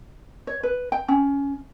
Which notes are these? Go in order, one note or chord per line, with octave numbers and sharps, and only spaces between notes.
C#5
B4
G5
C#4